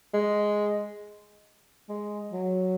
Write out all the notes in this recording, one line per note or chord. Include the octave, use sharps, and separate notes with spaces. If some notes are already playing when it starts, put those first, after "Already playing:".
G#3
G#3
F#3